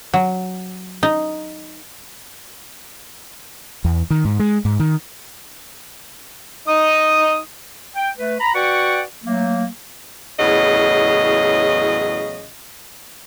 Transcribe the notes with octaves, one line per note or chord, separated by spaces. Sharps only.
F#3
D#4
E2
D#3
G#2
G#3
G#2
D#3
D#4 D#6
G5
A3 B4
A#5 B5
F#4 B4 D5 F#5 G5 C#6
F#3 A3 A#3
E2 A2 C#3 F#3 D#5